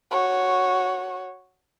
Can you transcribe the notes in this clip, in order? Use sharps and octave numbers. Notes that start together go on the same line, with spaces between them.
F#4 C#5